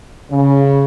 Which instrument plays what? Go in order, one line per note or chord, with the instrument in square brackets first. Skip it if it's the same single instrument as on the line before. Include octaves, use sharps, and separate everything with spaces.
[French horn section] C#3